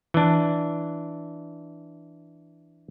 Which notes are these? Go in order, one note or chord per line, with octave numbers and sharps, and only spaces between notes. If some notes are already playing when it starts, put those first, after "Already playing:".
E3 D4